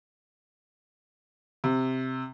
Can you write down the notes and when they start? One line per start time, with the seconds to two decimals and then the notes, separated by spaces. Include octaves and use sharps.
1.64 C3